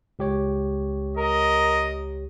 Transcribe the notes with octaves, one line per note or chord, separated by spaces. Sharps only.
C#2 G4 C#5
A#4 D#5